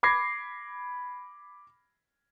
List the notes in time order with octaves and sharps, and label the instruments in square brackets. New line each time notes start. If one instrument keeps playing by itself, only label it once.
[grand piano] B5 D6 G#6 A#6 C7